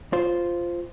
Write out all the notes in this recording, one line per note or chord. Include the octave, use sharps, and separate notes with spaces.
F4 C5